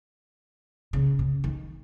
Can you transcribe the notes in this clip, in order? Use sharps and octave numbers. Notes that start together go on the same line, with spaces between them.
C#3
C#3
D#3